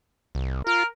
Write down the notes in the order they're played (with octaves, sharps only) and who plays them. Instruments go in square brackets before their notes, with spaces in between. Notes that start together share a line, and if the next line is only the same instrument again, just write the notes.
[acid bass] C2
[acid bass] F4 [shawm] A#4